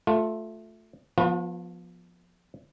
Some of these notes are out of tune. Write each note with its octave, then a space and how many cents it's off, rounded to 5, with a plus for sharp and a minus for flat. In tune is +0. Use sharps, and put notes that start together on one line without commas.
A3 +0 F4 +20
F3 +10 B3 -15 F#4 -45